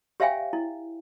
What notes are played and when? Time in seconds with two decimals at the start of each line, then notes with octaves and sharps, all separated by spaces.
0.20 G4 C#5 E5 F5 G5 G#5
0.53 E4